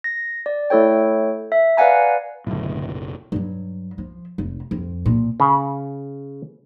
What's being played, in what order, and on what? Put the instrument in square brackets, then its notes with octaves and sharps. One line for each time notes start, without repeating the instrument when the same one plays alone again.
[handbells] A#6
D5
A3 E4 A4 C#5 G5
E5
B4 D5 F5 F#5 G#5 A#5
[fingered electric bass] F#1 B1 [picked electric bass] A2 D3
[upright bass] G2 F#3
F3
F1
F2
A#2
[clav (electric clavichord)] C#3